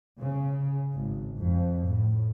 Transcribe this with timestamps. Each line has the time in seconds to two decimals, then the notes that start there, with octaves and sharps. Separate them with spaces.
0.19 C#3
0.93 G#1
1.36 F2
1.84 A2